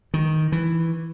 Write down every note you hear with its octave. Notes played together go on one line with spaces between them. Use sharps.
D#3
E3